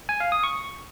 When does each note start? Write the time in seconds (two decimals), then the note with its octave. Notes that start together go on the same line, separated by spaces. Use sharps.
0.09 G#5
0.20 F5
0.32 D#6
0.43 C#6